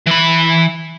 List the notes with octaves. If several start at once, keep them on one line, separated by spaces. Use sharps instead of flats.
E3 B5